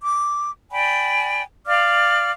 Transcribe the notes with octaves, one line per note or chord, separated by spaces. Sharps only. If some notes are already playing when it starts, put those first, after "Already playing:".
D6
D5 G5 G#5 B5
D5 F5 D6 F6